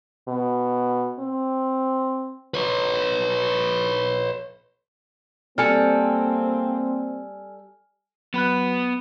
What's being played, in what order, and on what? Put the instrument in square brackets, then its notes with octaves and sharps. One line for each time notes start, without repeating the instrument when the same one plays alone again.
[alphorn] B2
C4
[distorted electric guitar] B4 C#5
[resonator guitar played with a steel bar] G3 A4 [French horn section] A#3 C4 [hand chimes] G#5 F6
[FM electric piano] F#3 B5 F#6 [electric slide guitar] B3 B4